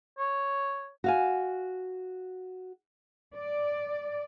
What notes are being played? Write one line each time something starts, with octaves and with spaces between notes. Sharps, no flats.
C#5
F#4 F5 G#5
D5